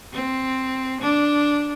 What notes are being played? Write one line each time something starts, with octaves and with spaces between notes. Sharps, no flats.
C4
D4